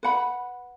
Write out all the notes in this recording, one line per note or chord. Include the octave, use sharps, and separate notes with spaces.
B4 F#5 B5